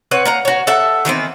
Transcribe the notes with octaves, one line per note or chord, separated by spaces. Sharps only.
C4 B4 C#5 F#5
A#3 F#5 A#5
F#4 C#5
A4 E5 F#5 A5
D#3 E3 B3 C4